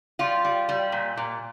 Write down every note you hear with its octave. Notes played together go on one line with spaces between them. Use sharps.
G3 F4
G3
G3
A#2
A#2